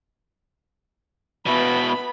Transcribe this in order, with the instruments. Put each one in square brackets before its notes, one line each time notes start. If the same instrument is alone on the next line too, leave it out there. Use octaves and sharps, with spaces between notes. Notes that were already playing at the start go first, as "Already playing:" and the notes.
[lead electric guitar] B2 E4 [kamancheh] B3 B5